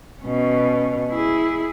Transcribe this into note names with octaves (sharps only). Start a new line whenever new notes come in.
B2 C#4
E4 G#4